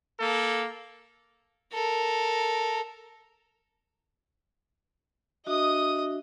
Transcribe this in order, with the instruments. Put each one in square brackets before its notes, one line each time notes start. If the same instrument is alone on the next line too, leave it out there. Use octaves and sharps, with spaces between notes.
[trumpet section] A#3 A4
[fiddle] A4 A#4
[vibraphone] D4 F#4 E5 [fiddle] D#5 D#6